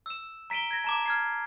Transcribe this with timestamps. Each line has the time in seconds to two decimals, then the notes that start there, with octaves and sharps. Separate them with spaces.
0.06 E6 E7
0.50 A#5 B6 D7 D#7 G7
0.71 G#6 A#6
0.84 A5 A#5 D6
1.06 F6 G#6 C7